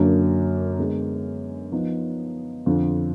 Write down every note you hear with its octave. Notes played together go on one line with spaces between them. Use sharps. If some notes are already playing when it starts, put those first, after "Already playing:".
Already playing: F#2 D3 F#3 A#3 D4
D3 G#3 B3
F3 B3 D#4
F2 D3 F3